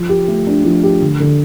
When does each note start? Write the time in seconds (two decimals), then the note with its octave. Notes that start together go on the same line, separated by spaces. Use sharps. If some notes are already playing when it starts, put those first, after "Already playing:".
Already playing: F3
0.09 G4
0.28 A3
0.47 D4
0.65 F3
0.83 G4
1.01 D3
1.20 D3